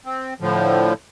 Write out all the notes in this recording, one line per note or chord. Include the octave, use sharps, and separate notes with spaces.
C4
A2 D3 F3